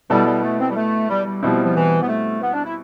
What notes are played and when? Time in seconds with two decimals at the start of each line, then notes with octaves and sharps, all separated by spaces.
0.10 B2 G3 B3 E4 A4
0.26 G3
0.42 A3
0.60 C4
0.70 G3
0.76 A3
1.09 G3
1.25 G3
1.43 B2 F3 G3 C4 E4
1.65 F3
1.76 E3
2.02 B3
2.09 A3
2.42 B3
2.53 D4
2.65 E4